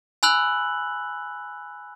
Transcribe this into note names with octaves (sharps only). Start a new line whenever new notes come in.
G#5 B5 E6 F#6 F#7